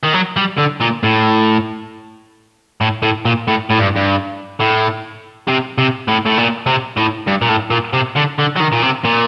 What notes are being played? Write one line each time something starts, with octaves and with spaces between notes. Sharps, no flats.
D#3
F#3
G3
D3
A#2
A2
A2
A2
A#2
A2
A2
G2
G2
A2
C3
C3
A2
A2
A#2
C3
A2
G2
A#2
A2
A#2
C3
D3
D3
F#3
D#3
A#2
C3
A#2